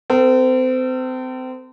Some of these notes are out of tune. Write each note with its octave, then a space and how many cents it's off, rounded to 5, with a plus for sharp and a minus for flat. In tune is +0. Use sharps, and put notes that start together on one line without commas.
C4 -30 A4 +35